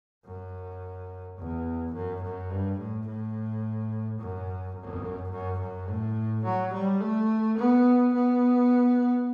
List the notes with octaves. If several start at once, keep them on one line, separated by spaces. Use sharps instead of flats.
F#2
E2
F#2
F#2
G2
A2
A2
F#2
F#2
F#2
F#2
A2
F#3
G3
A3
B3
B3